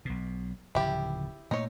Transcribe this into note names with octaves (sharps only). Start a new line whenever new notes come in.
B1 B2
D1 C#3 F3 E4 G4
A#2 A3 A#3 D#4 C#5